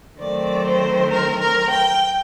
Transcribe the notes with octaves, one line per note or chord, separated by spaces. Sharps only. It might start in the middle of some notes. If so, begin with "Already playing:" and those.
D#3 F#3 A3 C4 D5
C5
A#4
A#4
G5